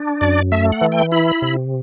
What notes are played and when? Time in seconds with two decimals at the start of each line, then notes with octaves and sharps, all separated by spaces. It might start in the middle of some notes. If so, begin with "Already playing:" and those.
Already playing: D4
0.21 F#2 D5
0.52 A3 E5
0.72 F#5
0.81 E3
0.92 G5
1.12 E4 B5
1.42 C3